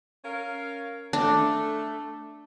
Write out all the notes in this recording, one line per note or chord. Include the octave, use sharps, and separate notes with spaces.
C#4 A#4 F5
A3 D4